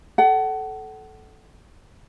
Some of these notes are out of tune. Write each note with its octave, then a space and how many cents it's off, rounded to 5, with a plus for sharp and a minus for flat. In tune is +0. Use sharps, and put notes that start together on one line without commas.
A4 -15 F#5 +30